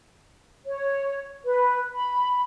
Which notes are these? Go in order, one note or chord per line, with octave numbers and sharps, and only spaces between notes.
C#5
B4
B5